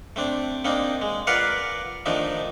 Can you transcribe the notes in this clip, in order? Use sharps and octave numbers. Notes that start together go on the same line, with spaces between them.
A3 C4 D4
A#3 C4 D4 D#4
G#3
F4 A#4 B4 D5 F5 F#5
D#3 F3 A3 D4 D#4